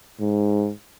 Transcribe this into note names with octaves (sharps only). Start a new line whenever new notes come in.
G#2